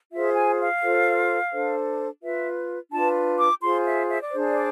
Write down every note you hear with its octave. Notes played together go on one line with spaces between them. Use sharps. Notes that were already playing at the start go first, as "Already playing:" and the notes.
F4 G#4 C5 E5
G#5
F5
F4 A4 C5
D4 A4 C5
F4 B4 E5
D4 F4 B4 A5
D6
F4 G#4 C5 C6
E5
E5
D5
D4 G#4 C5
D5